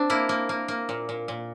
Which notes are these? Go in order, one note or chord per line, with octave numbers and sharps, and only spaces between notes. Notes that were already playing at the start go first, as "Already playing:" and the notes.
Already playing: C4 D4
A#3 E4
A#3
A#3
A#3
A#2
A#2
A#2